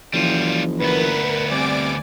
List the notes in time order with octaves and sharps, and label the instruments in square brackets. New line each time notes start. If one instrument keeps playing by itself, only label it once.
[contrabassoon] F#1 [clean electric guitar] E3 F3 [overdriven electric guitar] G3 F4
[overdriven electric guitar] D2 B3 [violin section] A#4 B4
[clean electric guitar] G3 C4 [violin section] D5 G#5 D6